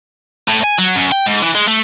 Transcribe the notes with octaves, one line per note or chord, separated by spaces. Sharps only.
A2
G#5
F#3
F#2
G5
G#2
E3
G#3
A3